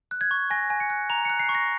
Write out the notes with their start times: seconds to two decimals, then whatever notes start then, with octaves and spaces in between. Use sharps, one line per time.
0.11 F#6
0.21 G#6
0.31 C#6
0.50 G#5 A#6
0.70 G#5
0.80 C#7
0.90 F#6
1.10 A#5 F7
1.25 F#6 C#7
1.39 C7
1.49 C#6
1.55 A#6